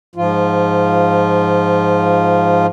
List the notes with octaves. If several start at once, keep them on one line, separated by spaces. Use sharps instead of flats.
G#2 F3 F4